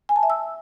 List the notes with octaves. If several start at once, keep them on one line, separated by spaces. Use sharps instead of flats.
G#5
A5
E5
E6